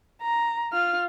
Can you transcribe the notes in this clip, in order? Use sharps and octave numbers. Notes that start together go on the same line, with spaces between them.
A#5
F4 F6